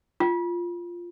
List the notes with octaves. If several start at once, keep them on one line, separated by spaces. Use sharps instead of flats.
F4